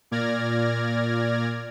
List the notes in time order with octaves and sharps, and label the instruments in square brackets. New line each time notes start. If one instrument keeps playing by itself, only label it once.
[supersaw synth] A#2 D5 F6 G#6 A#6